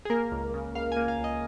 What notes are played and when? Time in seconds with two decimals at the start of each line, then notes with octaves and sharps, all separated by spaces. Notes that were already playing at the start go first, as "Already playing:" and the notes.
0.05 G#4
0.10 A#3 A#4
0.32 C#2
0.54 C#3
0.75 C#2 F5
0.92 A#3 G#5
1.08 F5
1.19 C#2
1.24 D#5